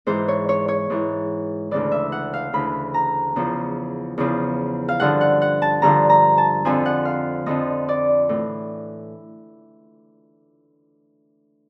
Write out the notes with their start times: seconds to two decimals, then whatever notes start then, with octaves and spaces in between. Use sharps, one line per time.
0.06 G#2 E3 C5
0.28 C#5
0.49 C#5
0.68 C#5
0.90 G#2 E3
1.71 D2 C#3 E3 D5
1.92 E5
2.12 F#5
2.33 F5
2.53 D2 C#3 E3 B5
2.94 A#5
3.36 E2 C#3 F3
4.18 E2 C#3 F3
4.88 F5
5.00 G2 D3 F3 F#5
5.21 F#5
5.42 F#5
5.62 A5
5.82 G2 D3 F3 A#5
6.09 A#5
6.38 A5
6.65 F2 D3 F3 G#5
6.86 F#5
7.05 F5
7.46 F2 D3 F3 D#5
7.88 D5
8.29 A2 E3